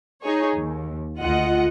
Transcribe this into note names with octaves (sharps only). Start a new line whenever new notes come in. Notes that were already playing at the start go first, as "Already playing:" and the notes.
D#4 G#4 C#5
D#2
D2 F4 D#5 F#5